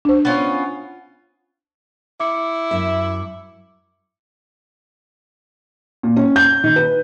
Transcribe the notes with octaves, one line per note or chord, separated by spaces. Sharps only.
D4 C5
B3 C#4 F4
E4 D6 C#7
F#2 E5
A#2
C#4
G6
D#3
B4